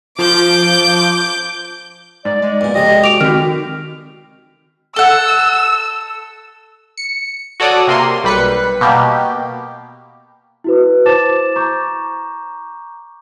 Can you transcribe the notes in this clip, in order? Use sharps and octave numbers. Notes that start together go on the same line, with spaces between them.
F3 D6 G6
G#2 D5
G#3 D5
E2 A#2
F2 C3 G#3 D#5
F#4 D6 D7 F7
D#3 C4 F#4 F6
A4 F#5 E6
C#7
F#4 A4 C#5 D5 D#6
C3 A#3 C6
B1 G3 B4 B6 C#7
B2 A#3 G4
E4 F#4 B4
E4 C5 A5 D6 A6 E7
A#5 C#6 D6 G6